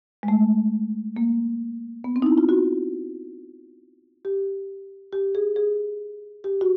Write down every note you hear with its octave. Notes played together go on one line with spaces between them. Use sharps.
G#3
A3
A#3
B3
C4
D#4
E4
F4
F#4
G4
G4
G#4
G#4
G4
F#4